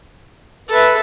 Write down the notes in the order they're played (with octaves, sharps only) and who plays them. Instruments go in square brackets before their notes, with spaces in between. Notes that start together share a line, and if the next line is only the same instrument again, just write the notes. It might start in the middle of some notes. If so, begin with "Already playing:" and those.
[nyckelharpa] A4 E5 [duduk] B4